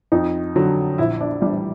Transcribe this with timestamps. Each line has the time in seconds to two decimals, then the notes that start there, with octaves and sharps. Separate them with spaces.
0.12 F2 D#4
0.56 D3 F#3
0.98 A#1 E4
1.21 D4
1.42 A2 E3 G3 D4